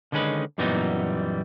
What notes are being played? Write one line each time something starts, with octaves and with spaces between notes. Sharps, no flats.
D3 D#3 G#3 C#4 B4
F#2 A#2 E3 G3 B3 D#4